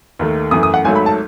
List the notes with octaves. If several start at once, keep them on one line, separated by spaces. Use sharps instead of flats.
D#2 D#3 A3
F#2 E3 A3 D#6
D#6
F#5
G#1 G#2 F#3 A3 G#5
B5
A5